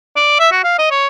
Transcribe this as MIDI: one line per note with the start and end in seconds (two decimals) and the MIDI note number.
0.17 0.36 74
0.40 0.48 76
0.52 0.60 66
0.64 0.74 77
0.78 0.89 75
0.91 1.07 73